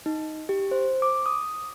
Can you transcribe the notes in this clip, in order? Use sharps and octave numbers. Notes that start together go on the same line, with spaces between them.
D#4
G4
C5
D6
D#6